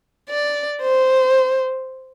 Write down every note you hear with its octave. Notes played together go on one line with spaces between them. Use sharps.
D5
C5